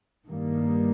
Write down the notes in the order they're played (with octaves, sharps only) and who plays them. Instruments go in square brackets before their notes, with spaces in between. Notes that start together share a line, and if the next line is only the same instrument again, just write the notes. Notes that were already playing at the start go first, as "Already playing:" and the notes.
[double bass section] G2 D#3 G3 A#3